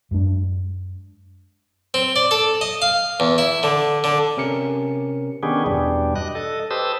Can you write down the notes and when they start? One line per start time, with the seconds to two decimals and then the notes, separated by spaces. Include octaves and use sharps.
0.11 F#2 G#3 D4
1.94 C4
2.16 D5
2.31 A4
2.61 D#5
2.82 F5
3.20 E2
3.38 E4
3.63 D3
4.04 D3
4.37 C3 C#4 A#4 C#7
5.43 D#3 B3 C#4 D4 G4 G#4
5.66 E2 G2 B2 G3 D4
6.16 D#5 F#6
6.35 A4 D#5
6.71 G4 B4 C5 A5 D#6 E6